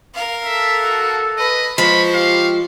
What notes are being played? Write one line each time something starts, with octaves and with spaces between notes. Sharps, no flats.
A#4 F5
A4 E5
F#4
B4 D#5
F3 G#3 C5 B5 C#6
G4 F5